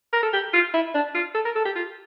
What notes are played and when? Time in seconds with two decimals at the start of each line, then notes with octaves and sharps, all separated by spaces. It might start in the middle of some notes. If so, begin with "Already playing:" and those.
0.13 A#4
0.23 A4
0.33 G4
0.54 F4
0.74 E4
0.95 D4
1.15 F4
1.35 A4
1.45 A#4
1.55 A4
1.65 G4
1.76 F4